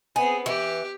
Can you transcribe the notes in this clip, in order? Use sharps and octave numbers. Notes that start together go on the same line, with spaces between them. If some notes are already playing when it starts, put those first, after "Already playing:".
B3 C4 G#4
E3 G4